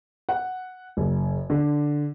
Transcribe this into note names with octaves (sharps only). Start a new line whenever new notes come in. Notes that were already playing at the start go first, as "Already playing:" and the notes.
F#5
F#1
D3